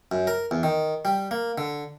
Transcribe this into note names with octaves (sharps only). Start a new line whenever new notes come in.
F#2
A#4
E2
D#3
G3
A#3
D3